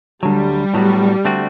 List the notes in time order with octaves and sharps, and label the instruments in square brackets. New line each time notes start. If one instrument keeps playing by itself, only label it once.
[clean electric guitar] D2 D3 F#3 [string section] G3
[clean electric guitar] A2 F#3 B3 F#4
D3 A3 C4 F#4